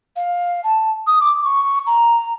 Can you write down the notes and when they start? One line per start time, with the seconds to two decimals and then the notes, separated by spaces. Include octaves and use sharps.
0.16 F5
0.64 A5
1.07 D#6
1.20 D6
1.44 C#6
1.87 A#5